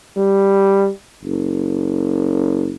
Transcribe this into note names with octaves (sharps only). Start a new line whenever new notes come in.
G3
F#1